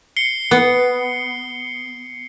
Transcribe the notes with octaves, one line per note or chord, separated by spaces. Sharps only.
C7 C#7 G7
B3